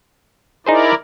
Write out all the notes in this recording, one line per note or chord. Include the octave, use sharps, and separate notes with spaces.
D#4 E4 G#4 A#4 C5 D5